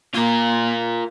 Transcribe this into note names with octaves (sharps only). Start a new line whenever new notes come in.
A#3 F4 A#4